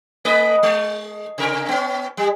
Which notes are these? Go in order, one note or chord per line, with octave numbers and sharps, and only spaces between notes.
A3 B4 D#5
G#3
C3 A#4
B3 C#4
G3